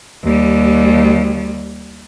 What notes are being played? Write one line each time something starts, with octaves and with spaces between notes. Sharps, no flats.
D#2 G3